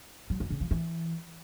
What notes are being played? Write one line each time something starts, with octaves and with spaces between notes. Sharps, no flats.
F#3
F#2
C#3
F3
E3